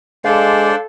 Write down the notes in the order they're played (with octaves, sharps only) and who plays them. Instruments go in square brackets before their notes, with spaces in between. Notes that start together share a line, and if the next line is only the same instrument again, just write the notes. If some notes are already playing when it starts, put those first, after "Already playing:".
[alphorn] G#3 [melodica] D4 C5 D5 [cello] A4 [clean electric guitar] F5